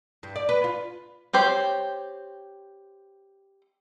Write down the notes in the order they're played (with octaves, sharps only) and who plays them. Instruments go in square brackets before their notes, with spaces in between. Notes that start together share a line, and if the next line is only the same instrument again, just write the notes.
[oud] G2
D5
B4
F4
[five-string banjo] C4 G4 C5 C#5